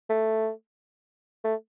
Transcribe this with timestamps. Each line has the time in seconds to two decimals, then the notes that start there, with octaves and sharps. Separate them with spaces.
0.10 A3
1.44 A3